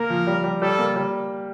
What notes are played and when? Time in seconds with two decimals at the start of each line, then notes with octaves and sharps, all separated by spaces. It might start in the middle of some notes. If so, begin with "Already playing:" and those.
Already playing: A#3 A#4
0.10 F3
0.27 G3
0.44 G3
0.62 G3 A4
0.79 A#3
0.96 G3